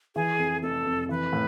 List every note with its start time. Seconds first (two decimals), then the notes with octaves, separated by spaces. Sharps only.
0.15 E3 G#4
0.39 F2
0.62 F1 A4
0.86 F1
1.09 E3 B4
1.33 A2